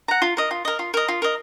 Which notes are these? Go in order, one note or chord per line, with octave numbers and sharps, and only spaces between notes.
F#5 A#5
F4
A#4 D#5
F4
A#4 D#5
F4
A#4 D#5
F4
A#4 D#5